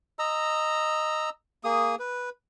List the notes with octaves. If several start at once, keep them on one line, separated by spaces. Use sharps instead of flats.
D#5 A#5 E6
A#3 G#4 D#6
B4